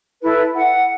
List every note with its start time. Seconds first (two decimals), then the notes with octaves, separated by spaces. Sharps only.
0.22 E4 A4 B4
0.54 F#5